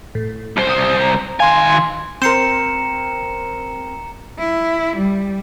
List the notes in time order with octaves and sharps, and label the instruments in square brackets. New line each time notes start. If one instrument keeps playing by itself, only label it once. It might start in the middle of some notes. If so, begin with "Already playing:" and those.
[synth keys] A2
[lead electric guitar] C2 C5
[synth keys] D#6
A#5
[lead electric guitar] D#3 G#5 [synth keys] F5 C6
[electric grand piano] C4 A#4 [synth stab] C5 [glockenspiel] A#5 C#7 E7
[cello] E4
G3